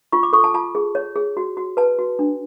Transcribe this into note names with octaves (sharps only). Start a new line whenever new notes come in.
F4 C#6
D6
A4 C#6
A5
F4 A5
G#4
C#5
G#4
F#4
F#4
B4 A5
F#4
D4